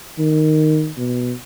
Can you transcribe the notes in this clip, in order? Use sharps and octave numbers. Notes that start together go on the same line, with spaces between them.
D#3
B2